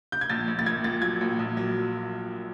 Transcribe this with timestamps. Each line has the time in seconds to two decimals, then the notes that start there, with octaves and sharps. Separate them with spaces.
0.12 G6
0.21 G#6
0.30 A#1 A6
0.48 A#1
0.59 A6
0.66 A#1 G#6
0.84 A#2 A6
1.02 F#3 G#6
1.21 A#1
1.39 A#1
1.57 F#3